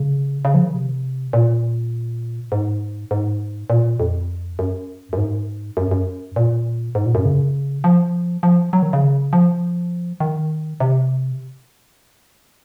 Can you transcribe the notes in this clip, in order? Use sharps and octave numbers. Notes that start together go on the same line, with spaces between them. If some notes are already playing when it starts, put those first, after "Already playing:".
Already playing: C#3
C#3
F3
D#3
C3
A#2
G#2
G#2
A#2
F2
F#2
F#2
G#2
F#2
F#2
A#2
G#2
A#2
F#2
C#3
F3
F3
F#3
D#3
C#3
F3
D#3
C3